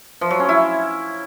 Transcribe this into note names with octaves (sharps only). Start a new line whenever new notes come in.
F3
F#3
C#4
E4